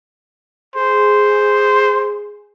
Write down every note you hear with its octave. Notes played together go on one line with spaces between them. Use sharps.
G#4 C5